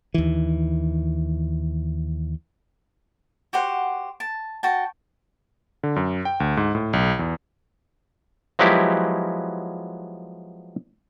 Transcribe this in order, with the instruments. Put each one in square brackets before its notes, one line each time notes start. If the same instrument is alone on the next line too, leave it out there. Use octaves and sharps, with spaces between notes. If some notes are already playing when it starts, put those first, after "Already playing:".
[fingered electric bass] D#2 E3
[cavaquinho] F#4 G4 C5 F#5
A5
F#4 G5 A5
[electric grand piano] D3
F#2
G5
D2
G#2
A2
B1
E2
[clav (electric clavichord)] F3 F#3 G#3 B3 E4 G4